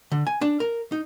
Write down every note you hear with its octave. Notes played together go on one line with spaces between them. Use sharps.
D3
G#5
D4
A#4
D#4